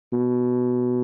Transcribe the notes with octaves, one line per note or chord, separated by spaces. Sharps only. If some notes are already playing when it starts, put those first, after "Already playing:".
B2